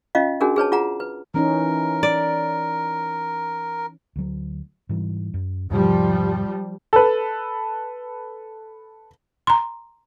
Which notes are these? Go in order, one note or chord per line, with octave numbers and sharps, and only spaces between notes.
C#4 F4 D#5 F5
C#4 D4 F#4 G#4 A#4
G#4 B4 C#5 A5
F4 G#4 F#5 A#5
B4
E3 C#4 D#4 A#4
D5
D2 F#3
G#2 E3 G3
F#2
E2 G#2 C3 F3 G3
A4 B4
A#5 C6